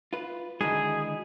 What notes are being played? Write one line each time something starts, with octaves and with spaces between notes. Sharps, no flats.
F4 B4
D3 D#3 G#3 E4 F#4 G#4 D#5